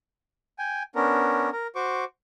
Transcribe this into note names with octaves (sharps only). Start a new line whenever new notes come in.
G5 G#5
B3 C#4 D4 A#4
A#4
F#4 C5 C#6 D6